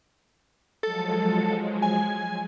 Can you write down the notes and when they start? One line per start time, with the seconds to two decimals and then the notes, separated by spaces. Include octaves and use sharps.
0.83 F3 F#3 G#3 A4
1.82 G#5